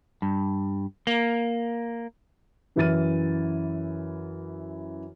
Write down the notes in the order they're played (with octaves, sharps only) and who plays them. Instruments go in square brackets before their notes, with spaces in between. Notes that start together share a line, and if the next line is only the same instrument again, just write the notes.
[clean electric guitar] G2
A#3
[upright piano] F#2 E3 E4 F6 A6 D#7